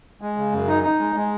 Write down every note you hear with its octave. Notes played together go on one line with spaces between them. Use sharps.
G#3
C#3
F#2
D#4
D#4
G#3
G#3